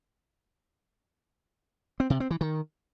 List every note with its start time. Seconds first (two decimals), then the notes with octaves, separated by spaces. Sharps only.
2.00 C4
2.10 C3
2.20 C4
2.31 E3
2.41 D#3